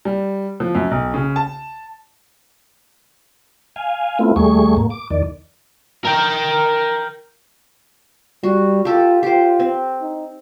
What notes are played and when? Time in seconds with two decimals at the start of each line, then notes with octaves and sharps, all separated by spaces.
0.05 G3
0.60 F3
0.75 F#2
0.91 B1
1.14 C#3
1.36 A5
3.76 F5 G#5
4.19 A3 B3 C4 E4 F4
4.36 D#2 G3 A3 G#4 C#6
4.77 G#2 A#3
4.90 D6
5.10 E2 D#3 D5
6.05 A#4 G5
8.43 G3 F#4
8.85 F4 G4 A4
9.23 F4 G4 C5
9.59 C4
10.01 D#4